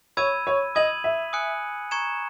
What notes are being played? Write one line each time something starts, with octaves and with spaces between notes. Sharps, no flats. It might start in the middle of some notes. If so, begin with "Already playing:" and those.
C#5 B5 E6 G#6 D#7
C#5
D#5 D#6 G#6 D#7 F#7
E5
G#5 D#6 F#6 C#7
A#5 C#6 G#6 C#7 E7